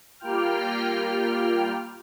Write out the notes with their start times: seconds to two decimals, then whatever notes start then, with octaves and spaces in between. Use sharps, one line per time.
0.19 G3 A#3 F4 G5 F6